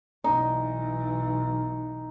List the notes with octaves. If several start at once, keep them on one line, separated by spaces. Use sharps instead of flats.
B1 E3 D#4